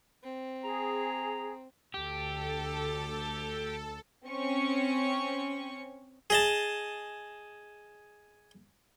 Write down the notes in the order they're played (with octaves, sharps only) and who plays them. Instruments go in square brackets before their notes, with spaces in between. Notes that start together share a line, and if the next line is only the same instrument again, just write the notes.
[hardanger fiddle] C4
[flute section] G#4 [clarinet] A#5
[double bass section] D2 [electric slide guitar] G4 [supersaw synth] A4
[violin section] C4 C#4 C#6
[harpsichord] G#4 D#5 A5